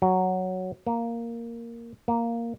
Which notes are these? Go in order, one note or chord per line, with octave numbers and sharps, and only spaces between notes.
F#3
A#3
A#3